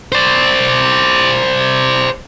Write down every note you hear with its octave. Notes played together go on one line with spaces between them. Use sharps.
C5 D5